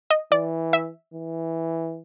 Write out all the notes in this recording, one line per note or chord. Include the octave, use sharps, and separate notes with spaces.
D#5
E3 D5
E5
E3